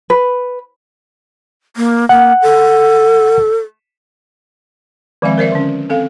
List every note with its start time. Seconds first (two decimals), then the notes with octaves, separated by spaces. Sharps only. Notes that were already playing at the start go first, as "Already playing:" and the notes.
0.10 B4
1.77 A#3
2.09 A#3 F#5
2.42 A4
5.22 D#3 F3 G#3 C4 E5
5.38 A#4 C5 D5 E5
5.52 D3 C#4
5.90 C4 A4 F5